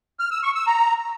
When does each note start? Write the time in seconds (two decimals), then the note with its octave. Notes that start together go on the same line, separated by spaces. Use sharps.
0.19 F6
0.31 E6
0.43 C#6
0.55 E6
0.67 A#5